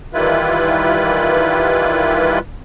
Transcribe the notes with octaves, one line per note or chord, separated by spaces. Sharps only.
D#3 E3 G3 E4 F4 B4